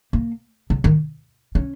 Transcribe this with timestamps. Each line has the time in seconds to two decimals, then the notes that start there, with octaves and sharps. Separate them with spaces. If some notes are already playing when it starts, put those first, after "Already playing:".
0.13 A#3
0.70 C#3
0.84 D#3
1.55 C#4